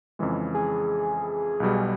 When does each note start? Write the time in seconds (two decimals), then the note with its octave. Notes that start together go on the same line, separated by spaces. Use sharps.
0.19 F2 C#3 E3 G#3
0.54 G#4
1.60 B1 B2 G3